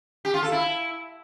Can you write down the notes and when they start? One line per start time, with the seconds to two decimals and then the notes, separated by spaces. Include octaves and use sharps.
0.25 G4
0.34 F4
0.43 A4
0.52 E4